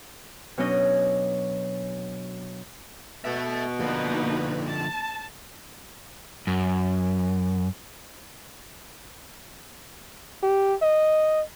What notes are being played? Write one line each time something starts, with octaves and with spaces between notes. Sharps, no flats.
B2 F#3 C#4 D4 D#5
B2 A4 E5
D3 F3 A#3 D#4 B4
A5
F#2
G4
D#5